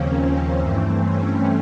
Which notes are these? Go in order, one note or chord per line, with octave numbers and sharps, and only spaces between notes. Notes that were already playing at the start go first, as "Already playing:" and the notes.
Already playing: D#2 C#3 F3 A#3 C4 C#4
C#4
G2 E3 A3 C4
C#4